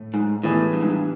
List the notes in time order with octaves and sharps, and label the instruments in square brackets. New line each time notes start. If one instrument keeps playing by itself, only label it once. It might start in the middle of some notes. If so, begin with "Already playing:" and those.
Already playing: [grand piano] A2 A3
[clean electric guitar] G#2
[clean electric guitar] A2 [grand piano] E3 G3 B3 E4 G#4
[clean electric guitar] G2
G#2
G2